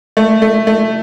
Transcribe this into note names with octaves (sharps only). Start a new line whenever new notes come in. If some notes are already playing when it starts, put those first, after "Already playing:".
A3
A3
A3